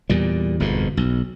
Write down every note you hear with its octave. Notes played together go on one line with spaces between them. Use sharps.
E2 A#2 G3
G1 F2 G#2 B2
B1